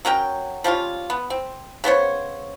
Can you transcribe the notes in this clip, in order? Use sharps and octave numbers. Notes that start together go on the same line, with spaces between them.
F#3 C#4 A#4 G5
F3 G3 C#4 F4
B3
C4
C#3 B3 C5 C#5